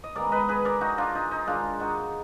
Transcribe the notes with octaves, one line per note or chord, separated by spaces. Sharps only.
D#5
G#2 D#3 G#3 B3 A#4 D5
B4 D#5
G#4 B4
A#4 D5
D#4 F#4
D4 F4
D#4
D#4
G#2 D#3 G#3 D4 F4
D#4 F#4